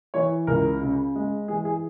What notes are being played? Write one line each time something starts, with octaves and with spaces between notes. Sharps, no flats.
E3 C#5
C#2 A#4
C#3
G#3
E3 G#4
G#4